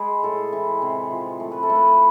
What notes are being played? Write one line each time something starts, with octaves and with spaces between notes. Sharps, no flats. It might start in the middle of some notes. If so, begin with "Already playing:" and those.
Already playing: G#3 B4
A2 A4
E3
C3
F3
A3
B4
A4
A3
B4